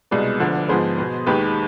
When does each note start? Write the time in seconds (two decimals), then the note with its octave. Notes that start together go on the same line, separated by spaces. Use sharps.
0.11 C2 B2 G#3 B3 B4 D5
0.40 D2 D3 F3
0.68 G#2 F3 B3 G#4 C5
0.98 B2 B3
1.26 D#2 D#3 G#3 G4 B4